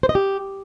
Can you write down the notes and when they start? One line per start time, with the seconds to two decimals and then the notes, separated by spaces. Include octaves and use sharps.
0.03 C5
0.09 D#5
0.15 G4